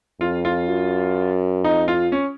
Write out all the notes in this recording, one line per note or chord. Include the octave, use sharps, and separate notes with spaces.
F2 F4
F4
F#2
F2 D#4
F4
C#4